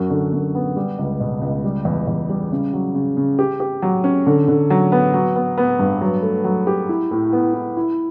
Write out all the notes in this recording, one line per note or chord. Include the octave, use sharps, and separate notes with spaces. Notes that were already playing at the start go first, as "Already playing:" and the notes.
Already playing: F#2 F#4
D3
F#2
B3
G3
C#2
B2
C#2
G3
E2
E2
G3
C#3
F#3
C#3
C#3
G4
G4
F#3
C#4
D3
D3
F#3
B3
F#3
B3
B3
G2
F#3
A3
F#3
G4
E4
A2
B3
E4
E4